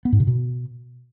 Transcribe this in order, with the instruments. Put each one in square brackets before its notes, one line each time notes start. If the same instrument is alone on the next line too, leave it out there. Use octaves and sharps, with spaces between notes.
[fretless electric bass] B3
G#2
C3
B2